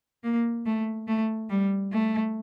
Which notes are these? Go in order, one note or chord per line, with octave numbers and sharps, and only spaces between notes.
A#3
A3
A3
G3
A3